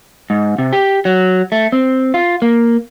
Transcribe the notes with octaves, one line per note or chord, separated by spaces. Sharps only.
G#2
C3
G4
F#3
A3
C4
F4
A#3